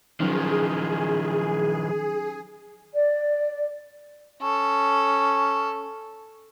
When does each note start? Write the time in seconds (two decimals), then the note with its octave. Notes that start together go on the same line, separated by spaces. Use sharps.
0.20 D#3 F3 F#3 C#4 D#4 G#4
2.95 D5
4.42 C#4 A4